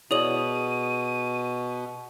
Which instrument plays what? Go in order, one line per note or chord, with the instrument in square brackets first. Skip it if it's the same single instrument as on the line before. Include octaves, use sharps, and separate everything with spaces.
[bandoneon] B2 [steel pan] E4 C#5 D5 [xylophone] G#4 D#6 F#7 [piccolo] D#7